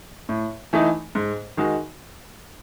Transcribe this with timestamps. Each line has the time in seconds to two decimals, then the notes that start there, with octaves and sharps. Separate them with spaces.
0.29 A2
0.73 E3 A3 D#4
1.15 G#2
1.57 D#3 G#3 D#4 F#4